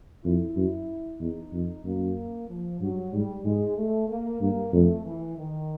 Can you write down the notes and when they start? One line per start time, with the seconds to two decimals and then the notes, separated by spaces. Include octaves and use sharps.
0.25 F2 E4
0.57 F#2
1.20 E2 D#4
1.53 F2
1.85 F#2 A#3
2.49 F3
2.81 G2 F#3
3.12 G#2 G3
3.45 G#2 G#3
3.77 A3
4.08 A#3
4.41 G2 A#3
4.73 F2 A3
5.04 E3
5.37 D#3